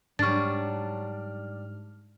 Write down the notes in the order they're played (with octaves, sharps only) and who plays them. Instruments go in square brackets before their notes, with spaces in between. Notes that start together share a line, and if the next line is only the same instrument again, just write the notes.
[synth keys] G#2 F6 [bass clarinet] F#3 [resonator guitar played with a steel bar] G3 D4 [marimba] C#6 A6